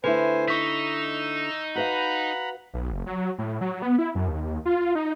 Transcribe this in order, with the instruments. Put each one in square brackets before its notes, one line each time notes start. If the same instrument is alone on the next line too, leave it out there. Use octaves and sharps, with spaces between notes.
[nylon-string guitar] D3 A3 E4 [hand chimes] B4 [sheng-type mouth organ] C5 G#5
[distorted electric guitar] D#4 [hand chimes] C#6 B6 [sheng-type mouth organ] E6
[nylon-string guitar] F#4 B4 F5 [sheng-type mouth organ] F#5 A#5 B5
[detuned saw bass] B1
F#1
F#3
A2
F#3
B3
E4
F#2
D#2
F4
D#4